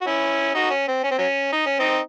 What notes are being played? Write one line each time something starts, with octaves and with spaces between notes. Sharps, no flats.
F#4
C#4 E4
D#4 F#4
C#4
C4
C#4
C4
F#3 C#4
D#4
C#4
C4 D#4